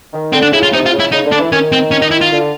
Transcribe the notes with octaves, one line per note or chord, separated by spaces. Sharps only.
D#3
D3 C4
D4
C#3 E4
F4
C3 D#4
F4
C#3
E4
C#3 D#4
D3
D4
E3
D#3 C#4
C4
C#4
D#4
E4
F4
D3